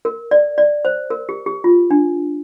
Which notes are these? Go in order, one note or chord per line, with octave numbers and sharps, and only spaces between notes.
A#4
D5
D5
C5
A#4
G4
G4
F4
D4